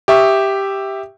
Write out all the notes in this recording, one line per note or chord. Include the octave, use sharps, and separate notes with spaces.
G4 E5 C#6 D#6